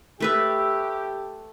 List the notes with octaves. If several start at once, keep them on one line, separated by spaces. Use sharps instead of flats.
A3 G4 B4 E5